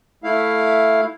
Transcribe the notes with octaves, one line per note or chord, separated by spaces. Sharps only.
A3 E4 F5